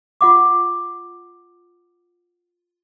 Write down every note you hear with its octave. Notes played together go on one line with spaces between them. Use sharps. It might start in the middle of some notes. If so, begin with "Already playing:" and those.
F4 F#5 D6